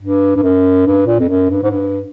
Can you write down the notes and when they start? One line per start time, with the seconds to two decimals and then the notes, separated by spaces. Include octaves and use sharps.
0.01 G2
0.36 G2
0.43 F#2
0.86 G2
1.07 A#2
1.19 F2
1.28 F#2
1.50 G2
1.63 G#2
1.70 G2